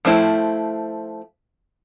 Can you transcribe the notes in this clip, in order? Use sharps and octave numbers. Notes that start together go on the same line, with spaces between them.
F3 A3 C4 E4